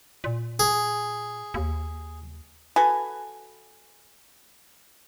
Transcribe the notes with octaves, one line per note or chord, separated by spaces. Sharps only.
A#2
G#4
D#2
F#4 A4 B4 G#5